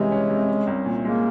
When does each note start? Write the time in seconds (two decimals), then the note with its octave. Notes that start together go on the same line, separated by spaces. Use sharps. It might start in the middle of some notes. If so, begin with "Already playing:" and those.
Already playing: C3 E3 G3 G#3 C#4
0.11 C#4
0.30 C3
0.49 C#4
0.67 C2
0.86 A#2
1.04 G#3 A#3